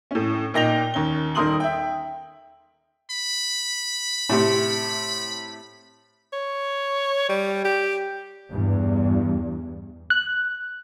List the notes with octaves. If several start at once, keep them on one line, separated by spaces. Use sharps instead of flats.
A2 C#4
A#2 D#4 G5 A#6 F7 G7
D#2 C#4 G7
D#1 D#3 A#4 C6 D#6 F#7
E5 G5
B5
A2 C3 G4
C#5
G3
G4
E2 G2
F#6